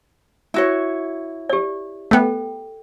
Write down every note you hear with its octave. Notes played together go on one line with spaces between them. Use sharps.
E4 F#4 C#5
G4 D5
A3 B3 A4 G5